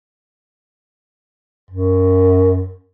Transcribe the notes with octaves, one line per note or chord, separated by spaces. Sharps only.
F#2